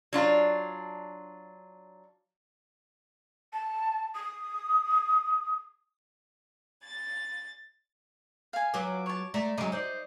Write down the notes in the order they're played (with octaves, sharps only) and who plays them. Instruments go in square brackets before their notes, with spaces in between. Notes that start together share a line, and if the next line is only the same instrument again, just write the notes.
[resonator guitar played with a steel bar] F#3 D4 F4
[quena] A5
D#6
[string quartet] A6
[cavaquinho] F5 G#5
[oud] F#3 F4 B4 [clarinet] D6
[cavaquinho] C#5 A5
[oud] A3 [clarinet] D5 [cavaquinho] A#5
[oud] C#3 F#3 [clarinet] G#3 [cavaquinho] D#5 A#5 D6
[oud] D#4 D5 [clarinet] C5